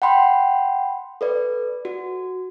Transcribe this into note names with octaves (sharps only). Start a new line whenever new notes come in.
F#5 G5 B5 C6
A4 B4 D5
F#4